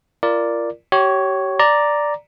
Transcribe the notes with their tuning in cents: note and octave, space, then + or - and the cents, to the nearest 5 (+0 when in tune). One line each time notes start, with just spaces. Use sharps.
F4 -35 A#4 +0 D5 +0
G4 -35 C#5 +0
D5 +0 A#5 +0